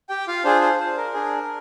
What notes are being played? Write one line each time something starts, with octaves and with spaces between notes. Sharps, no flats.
G4 G5
F4 F5
D4 F4 G#4 C5
C5
C5
A#4
D4 G#4